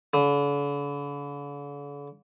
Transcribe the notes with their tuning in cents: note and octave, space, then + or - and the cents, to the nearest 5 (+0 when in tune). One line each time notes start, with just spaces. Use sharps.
D3 -45